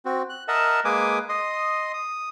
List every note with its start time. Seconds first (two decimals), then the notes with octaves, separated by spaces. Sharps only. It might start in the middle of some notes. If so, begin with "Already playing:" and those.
0.05 C4 F#4
0.30 F#6
0.48 A#4 D#5 E5 F#5 A5
0.85 G#3 A#3 B4 G#5 D6 D#6
1.29 D#5 C6 D#6
1.93 D#6